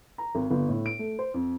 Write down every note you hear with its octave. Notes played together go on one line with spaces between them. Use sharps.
A#5
G#1
G1
A2
D7
A3
C5
F2